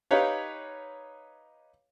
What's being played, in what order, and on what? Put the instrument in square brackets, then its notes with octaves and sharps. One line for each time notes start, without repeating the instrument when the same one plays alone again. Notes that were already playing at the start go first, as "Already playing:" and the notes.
[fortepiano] D#4 G4 B4 C#5 F5